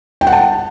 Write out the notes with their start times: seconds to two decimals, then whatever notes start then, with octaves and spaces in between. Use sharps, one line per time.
0.21 G5
0.27 F#5
0.32 A5